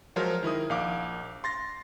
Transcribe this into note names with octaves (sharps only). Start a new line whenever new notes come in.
F3 F#3 G#3 A#4 C5 F6
D#3 E4 A#4 D#6
A#1 F5 D6
C6 A6 A#6